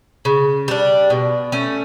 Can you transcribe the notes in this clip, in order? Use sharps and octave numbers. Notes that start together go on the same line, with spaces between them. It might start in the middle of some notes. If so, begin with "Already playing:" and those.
C#3
G3 D4
B2
A3 C#4